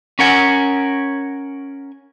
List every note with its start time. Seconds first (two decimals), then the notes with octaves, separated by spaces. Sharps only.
0.19 C#4 A#4 F#5 G#5